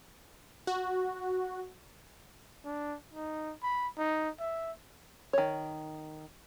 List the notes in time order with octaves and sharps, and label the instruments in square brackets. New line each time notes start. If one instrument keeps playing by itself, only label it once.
[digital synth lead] F#4
[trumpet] D4
D#4
B5
D#4
E5
[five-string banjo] D#3 C#5